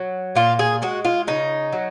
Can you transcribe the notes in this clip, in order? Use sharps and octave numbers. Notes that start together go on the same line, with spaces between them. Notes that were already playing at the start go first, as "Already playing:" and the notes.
Already playing: F#3
A#2 F4
G#4
G#3 F#4
F4
C#3 D#4
F#3